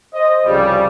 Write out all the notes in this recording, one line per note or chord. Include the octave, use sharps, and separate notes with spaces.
C5 D#5
C2 F2 C#3 F3 G3